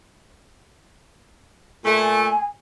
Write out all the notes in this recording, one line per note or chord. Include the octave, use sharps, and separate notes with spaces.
A#2 A3 G#5